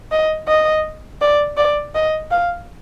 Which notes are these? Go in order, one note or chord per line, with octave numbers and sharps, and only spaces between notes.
D#5
D#5
D5
D5
D#5
F5